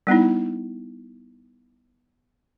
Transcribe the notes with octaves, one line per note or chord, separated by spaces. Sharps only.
G3 B3 D#4 E4